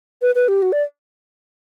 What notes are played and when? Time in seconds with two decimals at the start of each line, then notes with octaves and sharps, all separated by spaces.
0.22 B4
0.35 B4
0.48 G4
0.62 F#4
0.72 D5